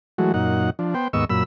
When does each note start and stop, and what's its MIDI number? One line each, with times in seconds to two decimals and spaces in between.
0.18 0.32 52
0.18 0.32 54
0.18 0.32 56
0.18 0.32 57
0.18 0.32 66
0.34 0.70 42
0.34 0.70 46
0.34 0.70 63
0.34 0.70 78
0.79 0.94 53
0.79 0.94 62
0.94 1.08 59
0.94 1.08 72
0.94 1.08 79
1.13 1.25 39
1.13 1.25 44
1.13 1.25 59
1.13 1.25 75
1.13 1.25 85
1.13 1.25 88
1.30 1.43 42
1.30 1.43 46
1.30 1.43 83
1.30 1.43 88